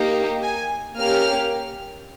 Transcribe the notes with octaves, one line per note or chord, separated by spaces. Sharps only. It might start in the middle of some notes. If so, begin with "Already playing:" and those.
Already playing: A#3 D#4 G4
G#5
A#3 C#4 G4 F6